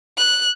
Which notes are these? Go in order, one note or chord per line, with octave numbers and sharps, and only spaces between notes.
F#6